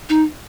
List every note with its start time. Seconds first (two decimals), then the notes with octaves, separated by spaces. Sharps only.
0.09 D#4